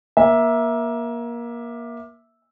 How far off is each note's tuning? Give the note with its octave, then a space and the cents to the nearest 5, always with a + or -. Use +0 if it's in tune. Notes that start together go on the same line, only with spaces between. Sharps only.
A#3 +25 E5 -5